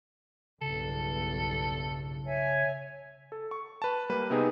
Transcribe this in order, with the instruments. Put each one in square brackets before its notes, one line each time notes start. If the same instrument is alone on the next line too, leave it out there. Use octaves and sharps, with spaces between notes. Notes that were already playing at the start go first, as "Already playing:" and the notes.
[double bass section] B1 E2 G2 [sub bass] C#3 [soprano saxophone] A4
[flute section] C#5 E5 G#5
[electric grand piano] A4
C#6
B4 A5
G3 A#3 B4
C3 B3 C4 D#4 G#4